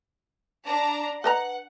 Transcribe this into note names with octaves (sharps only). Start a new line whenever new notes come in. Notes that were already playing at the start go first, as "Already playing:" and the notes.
D4 A#5
B4 D#5 F#5 A#5